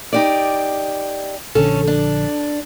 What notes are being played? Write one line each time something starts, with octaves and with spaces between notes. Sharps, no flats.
D#4 G4 D5
A#1 D3 C#4 A4
D4